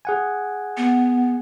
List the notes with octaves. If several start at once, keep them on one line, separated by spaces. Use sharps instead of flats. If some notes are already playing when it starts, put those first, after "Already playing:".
G#4 F#5 G#5
B3